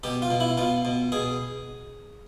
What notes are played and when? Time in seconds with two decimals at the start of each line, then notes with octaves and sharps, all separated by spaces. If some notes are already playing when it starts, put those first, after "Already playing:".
0.03 B2 G4
0.22 F4
0.30 B2
0.40 E4
0.58 B2 F4
0.85 B2
1.12 B2 G#4